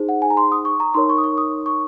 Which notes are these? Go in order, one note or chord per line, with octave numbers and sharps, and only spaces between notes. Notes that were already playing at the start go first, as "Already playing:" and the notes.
Already playing: D#4 G#4 C5
F#5
G#5
A#5
C6
D#6
C#6
A#5
D#4 A#4 C#5 C6
C#6
D#6
C#6
D#6
C#6